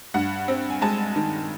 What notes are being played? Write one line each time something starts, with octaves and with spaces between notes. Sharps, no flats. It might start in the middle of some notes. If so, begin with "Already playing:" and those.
G2 F#5
C4
G#5
G#3 A5
D#3